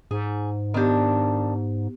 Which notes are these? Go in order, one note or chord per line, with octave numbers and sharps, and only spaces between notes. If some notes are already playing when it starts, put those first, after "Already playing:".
G#2 G#4
D#3 B3 D4 G4